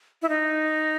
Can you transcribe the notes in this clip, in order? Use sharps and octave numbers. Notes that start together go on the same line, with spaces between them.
E4
D#4